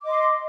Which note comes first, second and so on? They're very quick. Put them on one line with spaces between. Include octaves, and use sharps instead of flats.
D6 D#5 C6